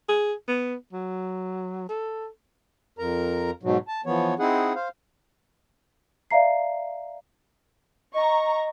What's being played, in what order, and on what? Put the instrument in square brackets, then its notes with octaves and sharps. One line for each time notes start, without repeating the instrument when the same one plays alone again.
[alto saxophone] G#4
B3
F#3
A4
[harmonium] F2 A#4 A#5
G#2 B2 F#3
A5
E3 F3 B3 C#5
C4 D#4 E4 G#4 F#5
C5 F5
[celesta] D5 E5 F5 A#5 C7
[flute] D#5 [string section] A#5 C#6